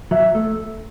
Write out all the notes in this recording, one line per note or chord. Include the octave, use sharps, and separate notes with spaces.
F#3 E5
A3